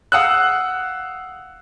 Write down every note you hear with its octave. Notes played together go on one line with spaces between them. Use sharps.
F5 F#5 D#6 E6 F#6